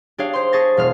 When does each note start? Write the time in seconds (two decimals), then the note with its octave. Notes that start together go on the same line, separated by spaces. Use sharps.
0.18 D4 G4 G#4 C#5 F5
0.33 C5 C6
0.52 G#4 A5 C#6 A6 A#6
0.77 E1 F5 F6